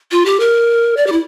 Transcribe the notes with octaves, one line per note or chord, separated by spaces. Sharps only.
F4
G4
A#4
D5
G4
E4